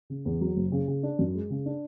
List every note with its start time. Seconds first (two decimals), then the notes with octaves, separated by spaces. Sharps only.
0.10 C#3
0.25 E2
0.41 F#3
0.56 F#1
0.72 C#3
0.88 C#3
1.03 D4
1.19 F#2
1.35 G#3
1.50 C#3
1.66 D4